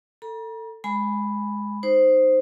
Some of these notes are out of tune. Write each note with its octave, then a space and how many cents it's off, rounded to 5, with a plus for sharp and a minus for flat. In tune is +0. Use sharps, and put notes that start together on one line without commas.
A4 +25 A#5 +40
G#3 +0 G#5 -5 B5 +0
D#4 -5 C5 +0